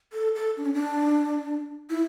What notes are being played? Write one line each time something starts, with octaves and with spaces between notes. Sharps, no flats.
A4
A4
D4
C#4
D4
E4